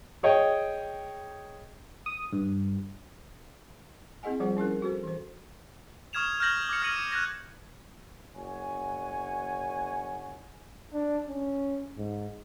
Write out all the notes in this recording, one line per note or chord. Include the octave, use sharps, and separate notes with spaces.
G#4 C#5 D#5 G5
D#6
G2
C4 E4 G#4 D#5 F#5 G#5
F3 G3 F4 G#4 C5 F#5
C#4 E4 G#4 A#4
F#4 A4 C5
E3 C5
C#6 D#6 F6 G#6 E7 F7
F6 G6 A#6 F#7
D6 G#6 C#7
F6 A#6 C#7 D#7 F#7
F#6 G#6 A#6
F#1 C#5 F#5 G#5
D4
C#4
G#2